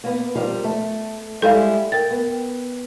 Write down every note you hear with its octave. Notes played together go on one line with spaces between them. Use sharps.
A#3 B3
F3 G3 A#4
A3
G3 G#3 E4 A4 F5
A#4 G5 A6
B3